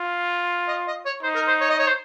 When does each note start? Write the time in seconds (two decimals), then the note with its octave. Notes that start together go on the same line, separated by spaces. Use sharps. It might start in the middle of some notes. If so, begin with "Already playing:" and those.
Already playing: F4
0.68 D#5
0.87 D#5
1.06 C#5
1.23 D#4 C5
1.35 A#4
1.48 C5
1.60 C#5
1.70 D#5
1.79 C#5
1.87 C5